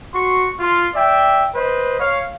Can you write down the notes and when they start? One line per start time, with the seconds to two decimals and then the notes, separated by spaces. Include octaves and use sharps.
0.14 F#4 C6 C#6
0.60 F4
0.95 D5 E5 G5
1.55 B4 C5 D#5
2.00 C#5 F5